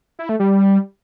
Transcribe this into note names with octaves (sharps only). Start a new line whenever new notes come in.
E4
A3
G3